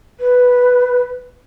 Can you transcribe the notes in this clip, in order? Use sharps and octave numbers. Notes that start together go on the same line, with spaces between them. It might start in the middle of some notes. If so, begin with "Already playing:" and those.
B4